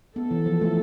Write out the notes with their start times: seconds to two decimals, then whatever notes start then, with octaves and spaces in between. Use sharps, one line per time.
0.15 B3 A4
0.31 E3
0.46 F3
0.61 A3